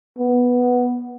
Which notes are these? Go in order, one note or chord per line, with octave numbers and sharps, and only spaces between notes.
B3